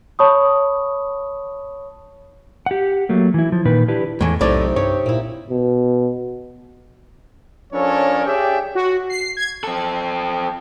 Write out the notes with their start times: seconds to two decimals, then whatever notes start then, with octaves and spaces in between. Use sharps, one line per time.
0.19 C#5 A5 B5 C#6 D#6
2.66 G4 F#5
3.09 F#3 A3 A#3
3.34 E3 E4
3.52 F3
3.65 A#2 D#3 B4
3.88 D4 E4 G4 B4
4.21 E2 A2 E3
4.41 B1 A2 C3 D#4 D5
4.76 G2 G4 C#5
5.06 A#2 A#3 E4
5.50 B2
7.73 F3 C#4 D4 A4 A#4 C#5
8.26 G4 G#4 C#5 D5 E5 G5
8.75 F#4
9.10 C7
9.37 G#6
9.64 C4 A4